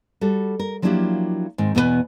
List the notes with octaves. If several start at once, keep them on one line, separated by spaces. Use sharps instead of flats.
G3 F#4 A4
A#4
F3 F#3 A#3 D4 E4 G4
G#2 D#3 C4
E2 B2 B3 C#4 B4 G#5